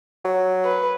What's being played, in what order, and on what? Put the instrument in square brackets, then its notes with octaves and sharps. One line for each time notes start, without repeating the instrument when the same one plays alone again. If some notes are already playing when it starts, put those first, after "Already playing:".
[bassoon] F#3
[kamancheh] B4